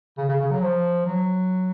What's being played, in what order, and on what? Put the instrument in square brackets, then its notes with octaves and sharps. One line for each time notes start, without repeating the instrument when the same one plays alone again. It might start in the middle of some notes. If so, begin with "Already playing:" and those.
[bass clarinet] C#3
C#3
C#3
F#3
F3
F#3